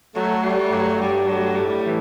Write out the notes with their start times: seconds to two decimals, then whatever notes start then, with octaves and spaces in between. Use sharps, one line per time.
0.15 F#3 A3
0.43 G3 A3
0.72 G2 F#3
1.00 G2 G3
1.27 F#3 A3
1.55 A2 G3
1.84 E3